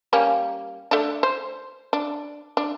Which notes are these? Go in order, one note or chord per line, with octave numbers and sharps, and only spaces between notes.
G3 A#3 C#4
A3 D4
C5
D4
D4